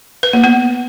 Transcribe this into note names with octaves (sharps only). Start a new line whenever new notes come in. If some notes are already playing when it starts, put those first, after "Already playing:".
B4
A#3
B3